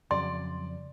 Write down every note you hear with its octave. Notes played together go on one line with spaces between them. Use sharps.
F2 C#3 F#3 D5 C6